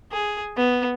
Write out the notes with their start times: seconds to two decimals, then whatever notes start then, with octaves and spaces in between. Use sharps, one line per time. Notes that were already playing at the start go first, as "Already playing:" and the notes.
0.12 G#4
0.57 B3